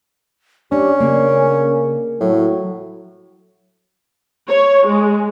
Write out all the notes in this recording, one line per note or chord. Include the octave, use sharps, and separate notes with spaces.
C#4 D4 G4
C#3 A#3
A2 F#3
C#5
G#3